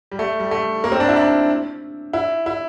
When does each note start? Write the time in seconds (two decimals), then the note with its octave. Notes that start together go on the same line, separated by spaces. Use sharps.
0.11 G3
0.19 A3
0.40 G3
0.51 A3
0.84 A#3
0.92 C4
1.00 D4
1.08 E4
1.16 D4
2.13 E4
2.46 E4